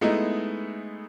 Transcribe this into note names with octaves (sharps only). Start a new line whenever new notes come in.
G#3 A3 B3 D#4 E4